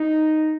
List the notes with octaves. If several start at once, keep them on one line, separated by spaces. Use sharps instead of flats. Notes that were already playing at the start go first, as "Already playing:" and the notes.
Already playing: D#4